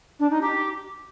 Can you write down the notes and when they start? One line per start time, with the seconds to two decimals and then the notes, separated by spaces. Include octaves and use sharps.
0.19 D4
0.30 D#4
0.41 G4